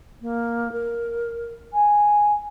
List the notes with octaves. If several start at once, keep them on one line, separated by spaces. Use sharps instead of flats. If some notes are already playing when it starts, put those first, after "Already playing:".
A#3
A#4
G#5